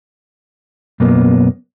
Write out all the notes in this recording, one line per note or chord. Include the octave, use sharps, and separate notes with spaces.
F#2 B2 A#3 B3